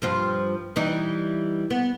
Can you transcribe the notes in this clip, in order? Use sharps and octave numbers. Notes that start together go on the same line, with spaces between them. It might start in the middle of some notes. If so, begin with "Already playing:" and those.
G2 F3 F4
E3 G3 D#4
B3